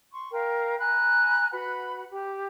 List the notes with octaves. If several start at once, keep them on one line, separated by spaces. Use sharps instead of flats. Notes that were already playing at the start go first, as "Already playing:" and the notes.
C6 C#6
A#4 F5 G5
G#5 A#5 B5 F#6
F#4 B4 F#5 B5
G4